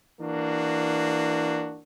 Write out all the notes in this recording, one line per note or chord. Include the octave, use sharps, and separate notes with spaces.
E3 A#3 D4 F#4